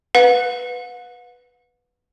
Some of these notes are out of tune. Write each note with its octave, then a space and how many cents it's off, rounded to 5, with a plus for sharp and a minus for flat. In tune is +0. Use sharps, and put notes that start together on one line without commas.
B4 +0 F#5 -45